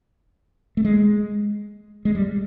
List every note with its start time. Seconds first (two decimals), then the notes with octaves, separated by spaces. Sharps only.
0.77 A3
0.85 G#3
2.05 G#3
2.15 G3